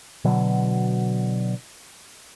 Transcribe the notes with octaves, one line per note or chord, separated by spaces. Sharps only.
B2 D3 F#3